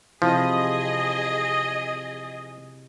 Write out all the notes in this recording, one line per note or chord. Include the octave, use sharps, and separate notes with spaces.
C3 F3 E4 G#4 D#5